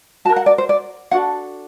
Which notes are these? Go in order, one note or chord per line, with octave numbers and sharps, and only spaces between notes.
F#4 A#4 A5
F#5
D5
C5
D5
D4 F#4 A4 F#5